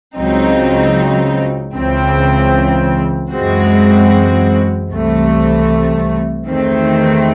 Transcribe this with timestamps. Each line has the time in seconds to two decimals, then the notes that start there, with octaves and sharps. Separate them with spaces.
0.16 C#2 C#3 F#3 C4 D#4
1.74 C#2 C#3 E3 C4
3.32 F#2 E3 G#3 C4 F#4
4.90 C2 C3 E3 A3
6.47 E2 D#3 A3 C4